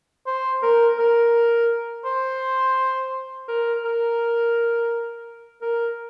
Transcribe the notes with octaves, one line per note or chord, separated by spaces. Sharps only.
C5
A#4
A#4
C5
A#4
A#4
A#4